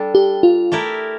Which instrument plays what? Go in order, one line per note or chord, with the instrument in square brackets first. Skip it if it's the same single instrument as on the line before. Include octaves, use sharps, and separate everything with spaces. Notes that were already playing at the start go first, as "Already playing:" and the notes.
Already playing: [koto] G3 D4 A4
[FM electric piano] G4
F4
[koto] A3 E4 G4 A#4